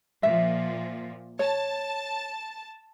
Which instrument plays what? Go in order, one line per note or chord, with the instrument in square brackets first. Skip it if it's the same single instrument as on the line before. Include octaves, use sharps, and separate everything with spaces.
[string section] A#2 F3 [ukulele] E5
[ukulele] C#5 [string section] A5